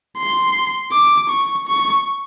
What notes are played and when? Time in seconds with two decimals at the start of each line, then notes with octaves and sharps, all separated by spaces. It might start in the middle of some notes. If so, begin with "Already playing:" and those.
0.18 C6
0.92 D6
1.30 C#6
1.67 C#6